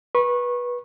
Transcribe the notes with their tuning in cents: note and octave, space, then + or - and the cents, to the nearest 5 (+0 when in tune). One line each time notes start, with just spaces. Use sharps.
B4 -20 C#6 -25